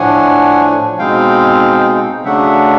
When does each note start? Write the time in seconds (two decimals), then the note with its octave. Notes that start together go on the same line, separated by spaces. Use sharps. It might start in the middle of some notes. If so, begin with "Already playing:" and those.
Already playing: A2 F3 A3 D4 F#5 G#5
0.98 B2 G#3 C4 D#4 F5 G5
2.24 C#3 F#3 A3 D4 E5 F#5